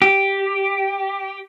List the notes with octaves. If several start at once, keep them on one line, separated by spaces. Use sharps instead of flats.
G4